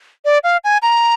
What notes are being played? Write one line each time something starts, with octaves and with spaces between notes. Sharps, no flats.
D5
F5
G#5
A#5